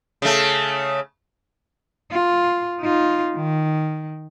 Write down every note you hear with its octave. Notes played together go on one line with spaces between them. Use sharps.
C#3 A3
F4
D#4 F4
D#3